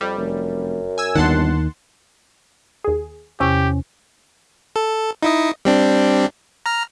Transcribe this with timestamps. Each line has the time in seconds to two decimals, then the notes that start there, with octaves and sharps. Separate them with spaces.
0.01 F2 G3
0.18 F1 F#2
0.98 G#5 E6
1.15 G1 D#2 D#3 F#5 A5 C6
2.84 D#2 G#4
3.40 E2 C3 C#4 G4 C#6
4.76 A4
5.23 D#4 E4 D#5
5.65 G3 C4 D4
6.66 A#5 F6